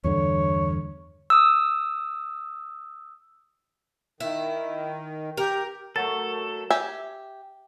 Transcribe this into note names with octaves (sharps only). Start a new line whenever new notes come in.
E2 G2 D3 C#5
D#6 E6
D#3 E4
G4 A#4
F#3 A3 A4 A#4 F#5 A6
G4 E5 G#5